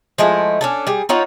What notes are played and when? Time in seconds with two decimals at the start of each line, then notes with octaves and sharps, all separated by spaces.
0.18 F3 G#3 A3 E4
0.61 C#4 D4 A4
0.87 G3 G#4
1.09 D#4 F4 C#5 F#5